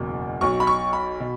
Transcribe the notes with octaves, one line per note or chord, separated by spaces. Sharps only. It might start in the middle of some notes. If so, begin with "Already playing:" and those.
Already playing: F#1 E2 B2
B1 B2 C#6
B5
C#6
B5
B2